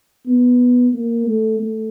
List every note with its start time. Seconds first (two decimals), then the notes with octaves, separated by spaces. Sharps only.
0.26 B3
0.93 A#3
1.27 A3
1.60 A3